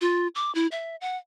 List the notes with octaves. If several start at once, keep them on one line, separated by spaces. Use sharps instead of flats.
F4
D6
E4
E5
F#5